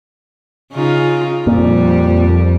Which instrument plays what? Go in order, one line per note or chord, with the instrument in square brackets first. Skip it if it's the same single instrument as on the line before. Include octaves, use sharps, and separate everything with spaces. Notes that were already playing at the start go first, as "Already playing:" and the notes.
[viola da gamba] C#3 D#4 F4
[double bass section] F2 [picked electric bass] A#2 [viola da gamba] G3